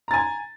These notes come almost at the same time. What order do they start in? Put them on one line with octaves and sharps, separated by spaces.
A#5 A6 G#5